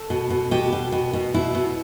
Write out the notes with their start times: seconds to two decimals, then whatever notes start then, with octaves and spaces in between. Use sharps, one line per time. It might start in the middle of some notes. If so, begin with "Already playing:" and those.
Already playing: A4
0.10 B2
0.30 B2
0.51 B2 G4
0.73 B2
0.92 B2
1.13 B2
1.34 B2 E4
1.55 B2